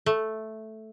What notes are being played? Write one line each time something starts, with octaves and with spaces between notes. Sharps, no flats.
A3